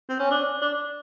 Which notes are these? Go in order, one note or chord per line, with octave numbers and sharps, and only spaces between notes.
C4
C#4
D4
D4